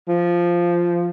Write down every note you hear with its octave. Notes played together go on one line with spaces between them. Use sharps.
F3